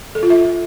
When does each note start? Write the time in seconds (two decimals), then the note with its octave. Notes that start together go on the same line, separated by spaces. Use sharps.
0.15 A4
0.23 F4
0.30 E5